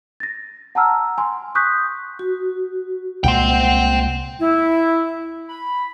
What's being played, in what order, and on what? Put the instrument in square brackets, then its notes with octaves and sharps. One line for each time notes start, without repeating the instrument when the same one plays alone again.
[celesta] A6 A#6
F#5 A5 A#5 E6 F6
G#5 C6
C#6 D#6 F#6 G6 B6
[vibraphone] F#4
[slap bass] C2 A#2 G#3 [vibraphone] F#5 [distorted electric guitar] G5 C6
[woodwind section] E4
B5